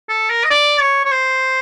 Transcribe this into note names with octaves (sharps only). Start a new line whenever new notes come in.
A4
A#4
D#5
D5
C#5
C#5
C5